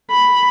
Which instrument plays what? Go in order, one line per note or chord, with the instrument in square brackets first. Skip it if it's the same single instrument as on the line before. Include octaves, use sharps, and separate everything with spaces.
[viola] B5